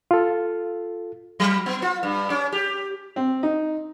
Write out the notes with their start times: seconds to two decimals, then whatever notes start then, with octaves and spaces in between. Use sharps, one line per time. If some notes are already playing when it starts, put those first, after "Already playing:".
0.11 F4 A4
1.40 F#3
1.66 B3
1.82 F4
2.03 G2
2.30 C#4
2.52 G4
3.16 C4
3.43 D#4